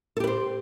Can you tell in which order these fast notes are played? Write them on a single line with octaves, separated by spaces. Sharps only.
A4 G4 B4 C5